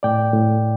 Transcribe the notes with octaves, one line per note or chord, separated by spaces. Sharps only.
A2 D5 G5
A2